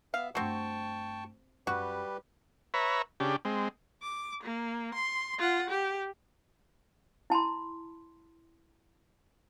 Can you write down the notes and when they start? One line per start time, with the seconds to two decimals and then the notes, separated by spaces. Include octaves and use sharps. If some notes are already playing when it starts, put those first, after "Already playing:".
0.14 B3 E5 F5
0.35 G2 A3 C4 F#4 G5 A5 C#6
1.67 F#2 G3 F#4 G4 B4
2.74 B4 C#5 E5 A#5
3.20 C#3 D4 G4
3.45 G#3 C4
4.02 D6
4.43 A#3
4.94 C6
5.38 F4 F#5
5.70 G4
7.30 E4 A5 B5 C6